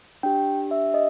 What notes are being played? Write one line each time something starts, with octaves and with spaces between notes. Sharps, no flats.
D4 G4 G5
E5
D#5